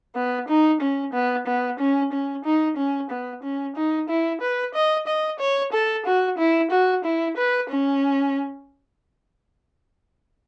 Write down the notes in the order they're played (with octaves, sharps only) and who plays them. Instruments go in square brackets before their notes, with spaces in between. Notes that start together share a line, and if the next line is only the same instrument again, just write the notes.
[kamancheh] B3
D#4
C#4
B3
B3
C#4
C#4
D#4
C#4
B3
C#4
D#4
E4
B4
D#5
D#5
C#5
A4
F#4
E4
F#4
E4
B4
C#4